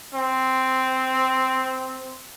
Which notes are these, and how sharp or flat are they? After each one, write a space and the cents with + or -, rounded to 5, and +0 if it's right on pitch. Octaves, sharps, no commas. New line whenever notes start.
C4 -5